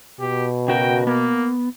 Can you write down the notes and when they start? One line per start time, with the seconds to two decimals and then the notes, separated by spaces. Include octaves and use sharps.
0.20 B2 G4
0.68 C#3 F#4 A#4 G5
1.07 A#3 B3